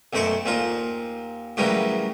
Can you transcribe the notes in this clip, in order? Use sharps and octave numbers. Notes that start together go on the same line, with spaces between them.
B1 F#2 A3 C5 D5 C#6
D#2 A#2 F4 C5
A2 C#3 E3 F#3 G3 A#3